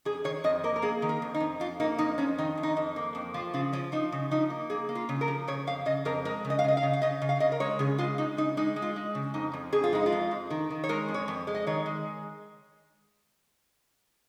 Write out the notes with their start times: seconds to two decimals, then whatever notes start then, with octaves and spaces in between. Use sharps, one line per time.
0.05 F2 G#4
0.24 D#3 C#5
0.44 F2 D#5
0.64 A#3 A#4
0.76 A#4
0.82 A#3 G#4
1.02 D#3
1.09 A#4
1.22 F2
1.34 D#4
1.40 F2
1.60 F2 F4
1.80 A#3 D#4
1.99 F2 D#4
2.18 F2 C#4
2.38 D#3 D#4
2.57 F2
2.63 D#4
2.77 F2
2.96 A#3
3.15 F2
3.34 F3 F4
3.54 C#3 F4
3.73 F3 C#4
3.92 F3 D#4
4.12 C#3
4.31 F3 D#4
4.50 A#3
4.70 A#3 G#4
4.89 A#3
4.95 F4
5.09 C#3
5.21 A#4
5.28 F3
5.48 C#3 C#5
5.67 F2 F5
5.86 C#3 D#5
6.05 F2 A#4
6.25 G#3 A#4
6.45 C#3
6.50 D#5
6.59 F5
6.64 C#3 D#5
6.77 F5
6.83 C#3
6.93 F5
7.02 C#3 D#5
7.22 C#3
7.29 F5
7.40 C#3 D#5
7.52 A#4
7.60 G#3 C#5
7.79 C#3 G#4
7.98 G#3 F4
8.18 G#3 D#4
8.37 C#3 D#4
8.57 G#3 D#4
8.76 G#3
8.82 F4
8.96 G#3
9.15 C#3
9.34 F2 D#4
9.53 F2
9.72 F2 G#4
9.84 F4
9.93 G#3 D#4
10.06 F4
10.12 F2
10.31 F2
10.50 D#3
10.70 D#3
10.84 C#5
10.89 G#3 A#4
11.09 F2
11.14 C#5
11.28 F2
11.47 G#3
11.55 D#5
11.67 D#3 C#5
11.86 G#3